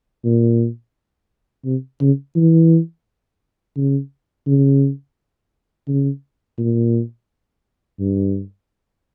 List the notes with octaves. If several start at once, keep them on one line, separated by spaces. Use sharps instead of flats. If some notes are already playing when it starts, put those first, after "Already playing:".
A#2
C3
C#3
E3
C#3
C#3
C#3
A#2
G2